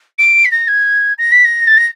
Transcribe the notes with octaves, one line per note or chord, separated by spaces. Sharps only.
D7
B6
A#6
G#6
A#6
B6
A#6
A6
A#6